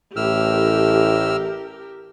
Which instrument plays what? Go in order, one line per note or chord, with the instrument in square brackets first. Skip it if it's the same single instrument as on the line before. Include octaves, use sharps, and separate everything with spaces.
[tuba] A1 [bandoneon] A2 E6 F6 [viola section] G4 A#4